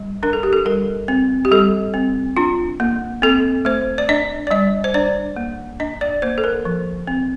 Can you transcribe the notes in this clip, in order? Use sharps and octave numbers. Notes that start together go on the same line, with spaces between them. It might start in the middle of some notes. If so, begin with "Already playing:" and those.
Already playing: G3
D4 A#4
A4
G4
A4
G3 A#4
C4
G4
G3 A4
C4
D4 F4
A#3
C4 A4
A3 C5
D5
D4 D#5
D5
G3 D#5
C5
D4 D5
A#3
D4 D#5
D5
A#3 C5
A4
A#4
F3
C4